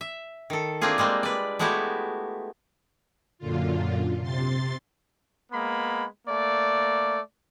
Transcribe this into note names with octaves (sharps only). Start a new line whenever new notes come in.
E5
D#3 A4
A3 A#3 C4 D4 F4 G#4
G3 G#3 A#3 C4
B4 D5
G#3 A3 B3 E4 F#4 G4
F#2 A#2 D3 F4
C3 C6 A6
G#3 A#3 B3 B5
A3 A#3 D5